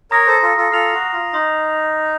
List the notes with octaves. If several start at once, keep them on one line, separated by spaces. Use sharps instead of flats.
A#4 C#5 A#5 D#6 A#6
A4 C5
F4 A4
F4 A4
F4 A4 F6 C7 F7
F#4
F4
D#4 C6 D#6 A#6